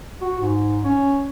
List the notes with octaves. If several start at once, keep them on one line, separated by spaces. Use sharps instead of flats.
F#4
G#2
C#4